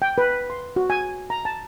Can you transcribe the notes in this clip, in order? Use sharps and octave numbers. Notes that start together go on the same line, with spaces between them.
G5
B4
C6
F#4
G#5
A#5
A5